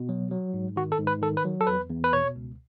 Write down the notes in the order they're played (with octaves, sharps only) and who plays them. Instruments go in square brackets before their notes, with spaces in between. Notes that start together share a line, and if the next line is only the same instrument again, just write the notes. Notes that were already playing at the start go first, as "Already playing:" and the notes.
Already playing: [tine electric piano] B2
F#3
F#3
G#2
D#3 F#4
A4
G#2
B4
D#3 A4
B4
F#3
A4
E2 B4
E2
B4
B2 C#5
C#2